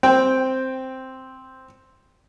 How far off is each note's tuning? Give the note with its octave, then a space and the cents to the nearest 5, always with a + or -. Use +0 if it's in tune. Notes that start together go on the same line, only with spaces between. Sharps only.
C4 +0 G5 +0